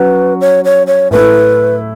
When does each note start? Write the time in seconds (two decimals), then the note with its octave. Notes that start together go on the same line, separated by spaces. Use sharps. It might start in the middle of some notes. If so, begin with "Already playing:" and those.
Already playing: F#3 C#4 F#4 B4
0.41 C#5
0.65 C#5
0.87 C#5
1.11 A2 A3 E4 B4